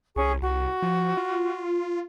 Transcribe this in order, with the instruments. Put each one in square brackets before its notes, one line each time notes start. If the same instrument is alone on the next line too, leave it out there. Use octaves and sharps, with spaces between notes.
[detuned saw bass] C2 [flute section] C#4 G#4 C#6
[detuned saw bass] C2 [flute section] F#4
[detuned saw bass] F3
F4